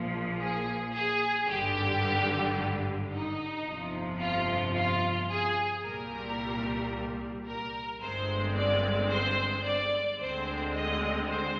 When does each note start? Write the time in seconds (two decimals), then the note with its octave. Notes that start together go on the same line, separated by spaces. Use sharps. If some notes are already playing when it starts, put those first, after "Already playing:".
Already playing: A#1 A#2 F3 A#3
0.39 G#4
0.93 G#4
1.47 G#1 G2 D3 G3 G4
3.12 D#4
3.65 G1 F2 C3 F3
4.19 F4
4.75 F4
5.29 G#4
5.83 C2 A#2 G3 A#4
7.47 A#4
8.01 G1 G2 D3 G#3 C4 C5
8.56 D5
9.10 C5
9.64 D5
10.19 D2 D3 G#3 C4 C5
10.74 D#5
11.28 C5